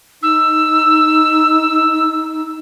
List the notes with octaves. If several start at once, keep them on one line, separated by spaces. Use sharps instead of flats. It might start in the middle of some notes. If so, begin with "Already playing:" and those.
D#4 E6